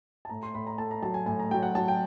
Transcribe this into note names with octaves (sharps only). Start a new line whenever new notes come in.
A5
A2 A#5
C6
A2 B5
A#5
A3 A5
A#5
F#3 A5
G#5
A2 G#5
A#5
F#3 G5
F#5
F#3 A5
G5